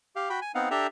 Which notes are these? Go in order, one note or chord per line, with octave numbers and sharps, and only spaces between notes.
G4 F5
F#4 G5 B5
G#5
B3 C4 D#4 F5 F#5
D4 G4 A4 E5 G5 A#5